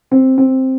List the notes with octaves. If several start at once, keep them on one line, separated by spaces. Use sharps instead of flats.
C4
C4